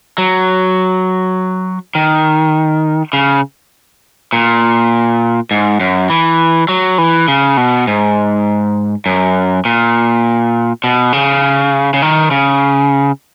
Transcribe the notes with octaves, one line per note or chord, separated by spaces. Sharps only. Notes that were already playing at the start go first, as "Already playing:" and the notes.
F#3
D#3
C#3
A#2
G#2
F#2
E3
F#3
E3
C#3
B2
G#2
F#2
A#2
B2
C#3
C#3
D#3
C#3